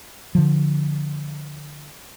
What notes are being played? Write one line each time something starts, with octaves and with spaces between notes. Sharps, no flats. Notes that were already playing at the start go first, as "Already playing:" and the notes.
D3 F3